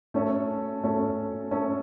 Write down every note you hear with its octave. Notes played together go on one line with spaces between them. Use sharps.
A3 C#4 A4
A3 C#4 A4
A3 C#4 A4